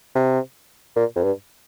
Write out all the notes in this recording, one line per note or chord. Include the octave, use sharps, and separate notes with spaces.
C3
A#2
F2
G2